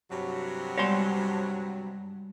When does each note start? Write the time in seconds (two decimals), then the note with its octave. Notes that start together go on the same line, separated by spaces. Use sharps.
0.11 G2 C3 F#3
0.78 G3 G#3 C#5 D5 F#5 C6